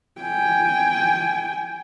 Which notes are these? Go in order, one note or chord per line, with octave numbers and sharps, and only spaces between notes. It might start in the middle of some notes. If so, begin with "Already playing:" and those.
G5 G#5